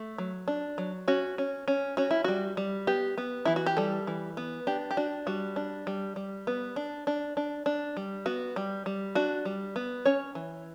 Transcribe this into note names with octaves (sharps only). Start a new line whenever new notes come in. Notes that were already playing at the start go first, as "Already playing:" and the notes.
Already playing: A3
F#3
D4
F#3
C#4 F#4
C#4
C#4
C#4 F#4
E4
G3 F#4
G3
B3 G4
B3
E3 E4
F#4
G4
G3 A4
E3
B3
D4 G4
G4
D4 F#4
G3 F#4
D4
G3
G3
B3
D4
D4
D4
D4
G3
B3 F#4
G3
G3
D4 F#4
G3
B3
C#4 C#5
E3